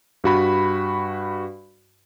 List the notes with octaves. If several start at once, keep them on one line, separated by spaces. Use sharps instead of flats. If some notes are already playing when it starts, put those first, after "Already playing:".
G2 F#4 B5